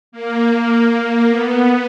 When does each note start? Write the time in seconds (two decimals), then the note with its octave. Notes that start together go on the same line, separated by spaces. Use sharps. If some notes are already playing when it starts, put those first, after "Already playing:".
0.12 A#3
1.28 B3